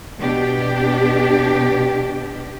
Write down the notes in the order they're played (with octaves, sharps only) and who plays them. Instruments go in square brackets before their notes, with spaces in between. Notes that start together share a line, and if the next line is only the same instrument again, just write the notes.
[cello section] B2 D4 G4